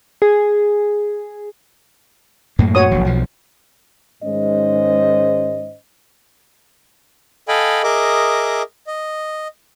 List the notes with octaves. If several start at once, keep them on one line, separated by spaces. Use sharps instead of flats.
G#4
F#2 A2 A#3
F#4 C#5 D#6
D#1 A#1 F#3
B1 B2 F3
G#2 D#3 G#3 C#4 C5 D#5
A4 D#5 F5 G5 G#5 B5
G#4 A#4 D#5 E5 D6
D#5